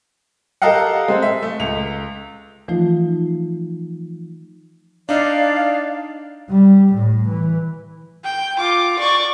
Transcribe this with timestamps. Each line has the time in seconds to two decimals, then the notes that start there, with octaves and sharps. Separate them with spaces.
0.62 G4 A4 A#4 D#5 F5 F#5
1.08 G#3 C4
1.22 E5
1.43 A3
1.59 C#2 F7
2.68 E3 F3 A3 D#4 F4
5.09 D4 D#4 D5 F5
6.50 G3
6.94 A2
7.29 E3
8.24 G5
8.59 F4 D6
8.99 D5 C#6